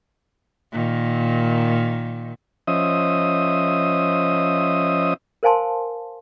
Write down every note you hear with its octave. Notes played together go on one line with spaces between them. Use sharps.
A#2 D#3
F3 C#4 C5 D#5 E5 D#6
A#4 C5 F5 G#5 A5 C6